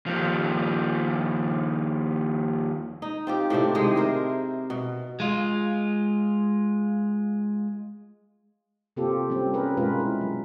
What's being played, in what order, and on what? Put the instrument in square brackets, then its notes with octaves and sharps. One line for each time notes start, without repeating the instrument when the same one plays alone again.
[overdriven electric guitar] D#2 F3
[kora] D#4
C4 F4 G4
A2 C3 C4 D4
C3 D#3 G#3 G#4
E4 A#4 C5
B2
[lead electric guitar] G#3 F4
[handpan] C3 A#3 C4 F4 G4 A4
G3 C4 C#4
C#4 G#4 A#4 B4
B2 G#3 F4 A#4 B4
E4
F#3